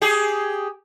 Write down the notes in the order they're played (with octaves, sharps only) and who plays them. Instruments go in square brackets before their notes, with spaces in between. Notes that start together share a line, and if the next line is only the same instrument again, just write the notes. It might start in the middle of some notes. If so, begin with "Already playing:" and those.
[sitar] G4 G#4